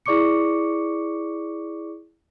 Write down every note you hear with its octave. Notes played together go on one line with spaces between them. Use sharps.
E4 G#4 D5 C#6 D6 C#7